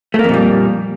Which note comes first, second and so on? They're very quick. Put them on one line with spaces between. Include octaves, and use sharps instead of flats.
A3 A#3 F2 A#2 G3